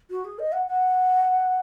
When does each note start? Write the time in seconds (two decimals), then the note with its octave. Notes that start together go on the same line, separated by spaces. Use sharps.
0.10 F#4
0.25 G#4
0.39 D#5
0.52 F#5
0.67 F#5